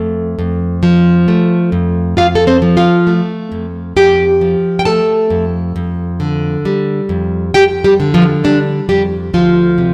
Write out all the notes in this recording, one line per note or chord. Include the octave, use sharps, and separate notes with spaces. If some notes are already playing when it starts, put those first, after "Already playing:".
Already playing: F2 A3
F2
F3
A3
F2
F2 F4 F5
A4
C4 C5
F3
F4 F5
A3
F2
F2 G4 G5
F3
G5
A3 A4 A5
F2
F2
D3
G3
F2
F2 G4 G5
G3 G4
D3
F3 F4
G3 D4
F2 G3 G4
D2 F3 F4
C3